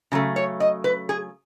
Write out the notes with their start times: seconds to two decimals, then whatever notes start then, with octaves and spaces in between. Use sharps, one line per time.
0.12 C#3 F#3 A3
0.36 C#5
0.60 D#5
0.84 B4
1.09 G#4